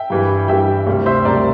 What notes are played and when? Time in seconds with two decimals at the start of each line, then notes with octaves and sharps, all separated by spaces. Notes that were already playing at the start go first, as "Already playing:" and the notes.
Already playing: E5 G5
0.10 G2 E3 G3
0.48 G2 E3 G3 E5 G5
0.87 D2 C3 G3
1.06 C5 E5
1.25 D2 C3 G3 A#4 D5